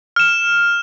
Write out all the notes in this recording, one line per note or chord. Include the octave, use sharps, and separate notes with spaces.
F6 E7